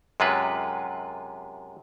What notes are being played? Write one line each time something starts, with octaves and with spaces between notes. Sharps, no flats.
F#2 C3 G#3 F4 B4